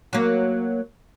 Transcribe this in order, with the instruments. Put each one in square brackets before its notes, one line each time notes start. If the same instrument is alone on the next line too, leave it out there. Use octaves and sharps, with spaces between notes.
[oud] F#3 A#3